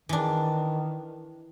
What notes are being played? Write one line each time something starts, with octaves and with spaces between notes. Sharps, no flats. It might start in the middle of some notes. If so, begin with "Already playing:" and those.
D#3 E3 D4